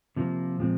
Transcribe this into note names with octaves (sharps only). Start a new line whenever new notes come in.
C3 F3 A#3
A#2 F3 G#3 C4